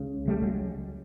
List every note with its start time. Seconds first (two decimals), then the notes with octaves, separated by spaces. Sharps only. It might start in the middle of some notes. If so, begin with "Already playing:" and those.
Already playing: C#2 C#3
0.28 G3 A3
0.42 F#3 G#3